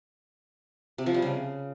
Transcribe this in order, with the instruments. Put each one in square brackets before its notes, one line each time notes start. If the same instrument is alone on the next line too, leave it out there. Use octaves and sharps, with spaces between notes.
[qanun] C3
F3
G3
C#3